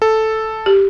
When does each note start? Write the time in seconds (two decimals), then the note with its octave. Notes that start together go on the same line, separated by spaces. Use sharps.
0.02 A4
0.66 G4